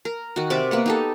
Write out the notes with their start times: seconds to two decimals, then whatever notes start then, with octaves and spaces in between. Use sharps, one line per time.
0.05 A#4
0.36 D#3 F#4
0.50 C3 D5 E5 D6
0.71 A#3 B3 F#5
0.86 D#4 G4 A4